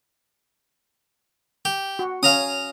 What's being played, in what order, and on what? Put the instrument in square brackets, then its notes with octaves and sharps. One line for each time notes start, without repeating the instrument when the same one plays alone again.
[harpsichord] G4
[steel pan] F#4
[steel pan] C#4 [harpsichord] F5 A#5 D#6